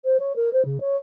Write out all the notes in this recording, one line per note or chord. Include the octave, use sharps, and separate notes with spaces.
C5
C#5
A#4
C5
C#3
C#5